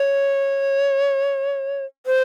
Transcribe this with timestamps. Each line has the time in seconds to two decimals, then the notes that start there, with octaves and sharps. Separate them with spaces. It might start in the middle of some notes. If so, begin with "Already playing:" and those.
Already playing: C#5
2.06 C5